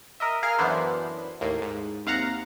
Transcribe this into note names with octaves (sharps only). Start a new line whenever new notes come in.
A#4 D#5 E5
G#4 A#4 F5 F6
F#2 E3 B3 D4 E4 C5
D#2 A2 A#3
G#2
D#2 C3 F5 F#5 A#5